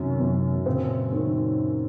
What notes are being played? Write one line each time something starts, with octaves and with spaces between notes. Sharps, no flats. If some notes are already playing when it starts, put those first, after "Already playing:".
Already playing: F#2 C3 D#3 C#4
F#2
A#2 C#3 C4
D#3